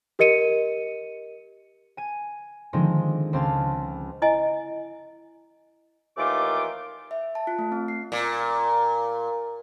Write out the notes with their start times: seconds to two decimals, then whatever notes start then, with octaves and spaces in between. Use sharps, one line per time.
0.19 G4 A#4 D#5 C#7 D#7
1.97 G#5 D#7
2.73 D3 D#3 F3 G#3 C4 D#4
3.33 C#2 C4 F5 A5 A6
4.22 E4 D#5 G#5
6.16 D#2 D#3 E3 A3 F4 D6
7.11 E5
7.35 A5
7.47 F4
7.59 A3
7.72 C4
7.88 C7
8.12 A#2